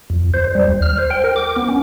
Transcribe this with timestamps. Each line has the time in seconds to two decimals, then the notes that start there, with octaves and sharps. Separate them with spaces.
0.10 F2
0.34 C5
0.55 G3
0.68 D#2
0.82 F6
0.99 C5
1.10 G5
1.24 A#4
1.36 D6
1.56 B3
1.69 C#4